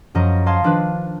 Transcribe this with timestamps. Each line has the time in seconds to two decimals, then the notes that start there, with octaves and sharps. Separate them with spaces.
0.15 F#2 F3 D#5 A#5
0.46 D#5 F5 A5 C6 G#6
0.63 D#3 F3 D4 B4